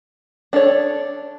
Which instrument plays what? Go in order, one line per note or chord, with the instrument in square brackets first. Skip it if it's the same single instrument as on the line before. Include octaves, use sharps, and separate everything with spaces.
[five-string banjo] D4 A4 C#5